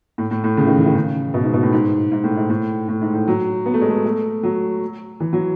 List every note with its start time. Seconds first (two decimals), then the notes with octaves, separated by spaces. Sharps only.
0.18 A2
0.31 A2
0.44 A2
0.57 C#3
0.66 D#3
0.76 E3
0.85 D#3
0.95 C#3
1.34 B2
1.44 G#2
1.54 B2
1.63 A2
1.73 G#2
2.12 G#2
2.24 A2
2.37 G#2
2.50 A2
2.88 A2
3.01 G#2
3.14 A2
3.28 F#3
3.66 B3
3.74 A3
3.82 G#3
3.90 A3
4.04 A3
4.43 F#3
5.20 E3
5.33 F#3